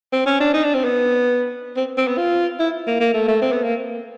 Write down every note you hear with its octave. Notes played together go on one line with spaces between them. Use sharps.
C4
C#4
D4
D#4
D4
C4
B3
C4
C4
B3
F4
E4
A#3
A#3
A3
A3
C4
B3
A#3